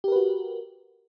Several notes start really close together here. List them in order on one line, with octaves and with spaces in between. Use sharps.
G4 A#4 B4 F#4